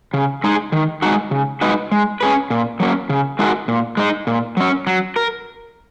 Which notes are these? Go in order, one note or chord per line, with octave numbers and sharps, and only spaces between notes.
C#3
G#3 D#4 G#4
D#3
G#3 D#4 F#4
C#3
G#3 D#4 F#4 B4
G#3
C#4 G#4 B4
A#2
F#3 A#3 C#4
C#3
G#3 D#4 F#4 A#4
A#2
G#3 D#4
A#2
F#3 C#4
F#3
A#4